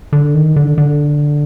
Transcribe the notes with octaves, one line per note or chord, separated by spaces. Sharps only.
D3
D#3
D3
D3